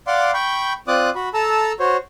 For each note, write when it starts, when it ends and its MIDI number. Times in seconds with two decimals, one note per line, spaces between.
0.07 0.31 74
0.07 0.31 77
0.07 0.31 78
0.07 0.31 84
0.07 0.31 86
0.34 0.73 79
0.34 0.73 83
0.34 0.73 85
0.34 0.73 91
0.88 1.10 60
0.88 1.10 65
0.88 1.10 74
0.88 1.10 86
0.88 1.10 87
0.88 1.10 90
1.15 1.29 66
1.15 1.29 83
1.34 1.72 69
1.34 1.72 81
1.34 1.72 82
1.34 1.72 88
1.80 1.97 66
1.80 1.97 72
1.80 1.97 73